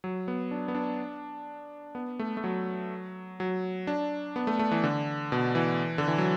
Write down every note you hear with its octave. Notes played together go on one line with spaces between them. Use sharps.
F#3
B3
D4
B3
D4
B3
A3
A3
F#3
F#3
D4
B3
A3
A3
E3
D3
B2
E3
D3
E3
F#3